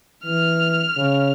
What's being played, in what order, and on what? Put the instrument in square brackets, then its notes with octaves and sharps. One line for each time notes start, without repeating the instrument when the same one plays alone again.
[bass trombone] E3 [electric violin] F6
[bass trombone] C#3